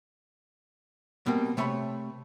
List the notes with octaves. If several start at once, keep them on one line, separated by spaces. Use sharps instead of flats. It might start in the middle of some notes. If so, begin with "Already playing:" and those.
B2 G3 A#3 C4
C3 A3 C#5 E5 B5